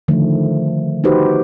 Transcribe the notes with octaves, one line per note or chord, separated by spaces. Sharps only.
D3 D#3 F3 A3
D#4 F#4 G4 B4 C5